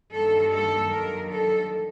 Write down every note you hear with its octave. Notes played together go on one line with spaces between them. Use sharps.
G2 D#3 G3 A#3 A4
A4
G2 D#3 F#3 A#3 A#4
A4